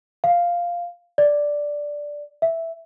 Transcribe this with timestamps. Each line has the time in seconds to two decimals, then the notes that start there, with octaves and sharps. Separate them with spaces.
0.24 F5
1.18 D5
2.42 E5